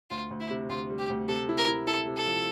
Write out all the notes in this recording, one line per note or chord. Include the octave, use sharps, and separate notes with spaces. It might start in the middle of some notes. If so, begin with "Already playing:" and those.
D2 F4
D2
E4
C3
D2 F4
G3
G4
D2
C3 A4
E4
A#4
E4
E4 A4
C3
A4
F3